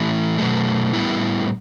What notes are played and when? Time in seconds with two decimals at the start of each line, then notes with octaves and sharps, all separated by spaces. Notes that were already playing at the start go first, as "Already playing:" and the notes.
Already playing: A2 E3 A3 C#4 E4
0.38 B2 F#3 A3
0.93 A2 G3 B3 E4